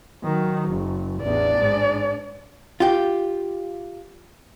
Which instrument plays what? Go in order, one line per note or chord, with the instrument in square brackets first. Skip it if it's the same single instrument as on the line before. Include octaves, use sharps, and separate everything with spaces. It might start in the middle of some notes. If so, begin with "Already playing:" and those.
[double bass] D#3 F#3
F#1
[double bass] A1 E2 [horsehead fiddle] D4 D5
[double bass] G#2
[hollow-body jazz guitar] F4 G4